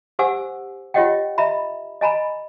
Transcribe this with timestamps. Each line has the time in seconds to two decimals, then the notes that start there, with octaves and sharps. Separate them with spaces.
0.19 G4 C5 F#5 G#5 D6 E6
0.94 F4 G4 C#5 D#5 F#5 G5
1.38 D#5 E5 A#5 B5
2.01 D#5 G#5 A#5 B5